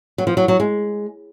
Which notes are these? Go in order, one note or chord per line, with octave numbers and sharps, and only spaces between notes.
F#3
F3
F#3
F#3
G#3